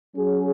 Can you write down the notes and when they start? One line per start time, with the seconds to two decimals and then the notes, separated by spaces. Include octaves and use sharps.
0.16 F#3 C#4 G#4